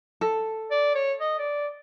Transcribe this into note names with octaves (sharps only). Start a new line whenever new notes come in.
A4
D5
C#5
D#5
D5